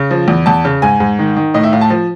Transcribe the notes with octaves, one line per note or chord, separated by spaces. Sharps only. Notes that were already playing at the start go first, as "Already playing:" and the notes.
Already playing: C#3
F3
E2
E2 A5
C#3
G#2 G#5
G#2
D#3
D#3
A2 D#5
E5
A2 F5
A5
F3